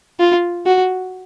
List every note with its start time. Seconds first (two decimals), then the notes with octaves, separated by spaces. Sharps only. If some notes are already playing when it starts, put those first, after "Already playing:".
0.20 F4
0.66 F#4